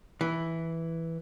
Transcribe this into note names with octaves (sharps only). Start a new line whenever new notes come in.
E3